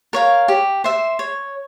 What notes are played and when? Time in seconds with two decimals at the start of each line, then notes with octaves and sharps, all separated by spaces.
0.13 A#4 C#5 F5
0.48 G4
0.84 C5 E5
1.19 C#5